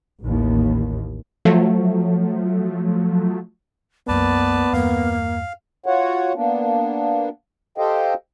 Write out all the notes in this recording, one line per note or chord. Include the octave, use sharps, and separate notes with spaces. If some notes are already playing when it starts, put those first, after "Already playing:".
A1 D#2
F3 F#3 A3
C2 F#2 A#3 B3 B4 D5 A5
E2 G2 A#3 F5
F4 F#4 C#5 F#5
A#3 B3 D4
G4 A4 C5 D#5 F5 G5